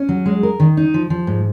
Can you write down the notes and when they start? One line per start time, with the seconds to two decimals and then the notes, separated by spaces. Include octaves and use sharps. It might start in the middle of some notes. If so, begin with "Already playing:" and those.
Already playing: C#4
0.09 F#3
0.26 G#3
0.43 A#4
0.60 D#3
0.77 D#4
0.94 F3
1.10 F3
1.27 G#2